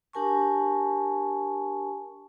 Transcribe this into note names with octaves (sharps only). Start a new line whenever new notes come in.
D4 G4 A#4 G#5 A5 C#6